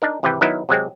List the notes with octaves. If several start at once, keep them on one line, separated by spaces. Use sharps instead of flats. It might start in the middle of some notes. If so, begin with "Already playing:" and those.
D4 D#4 A#4
G#1 C3 E3 B4 G5
D#3 F#3 B3 D#4 E4
C3 F#3 G#3 C4